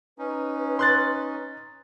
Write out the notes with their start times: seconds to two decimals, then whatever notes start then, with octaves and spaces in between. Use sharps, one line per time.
0.18 C#4 D#4 B4
0.79 C6 F#6 A6